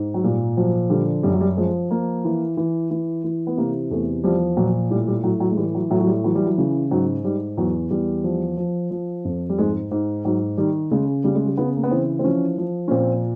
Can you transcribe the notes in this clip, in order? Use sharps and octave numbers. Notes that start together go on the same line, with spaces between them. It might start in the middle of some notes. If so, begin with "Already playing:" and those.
Already playing: G#2
F#3
A#2 G3
F3 F#3
D3 G3
F#2 G3
F#3
G3
F3 G#3
F3 A#3
E3
E3
E3
E3
B3
C3 A#3
E2 A3
F3 G3
A#2 F#3
A2 G3
G3
A2 F#3
F#3
G#3
E3 G3
F#3
A2 F#3
F#3
G3
E3 F#3
G3
F#3
C#3
G#2 F#3
G#2 G3
E2 F#3
E2 G3
F3
F3
F3
F2
G3
G#2 G#3
G#2
G#2 F#3
D#3 G3
C#3 G#3
C#3 G3
G#3
G3
C#3 B3
A#3
B3
E3 C4
C4
F3 C#4
F3
C#4
A#2 C4